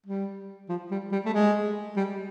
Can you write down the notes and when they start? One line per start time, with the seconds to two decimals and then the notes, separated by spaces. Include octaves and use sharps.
0.06 G3
0.69 F3
0.91 G3
1.12 G3
1.25 A3
1.33 G#3
1.96 G3